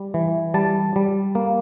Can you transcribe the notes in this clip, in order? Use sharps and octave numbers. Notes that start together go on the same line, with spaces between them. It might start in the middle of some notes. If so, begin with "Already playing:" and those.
Already playing: G3
E3
G3 A5
G3
A#3